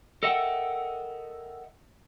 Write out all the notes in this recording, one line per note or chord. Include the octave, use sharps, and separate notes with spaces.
A4 A#4 D#5 E5 F#5 G5